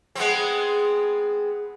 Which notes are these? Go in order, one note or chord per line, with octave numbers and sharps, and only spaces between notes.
G#3 B3 C4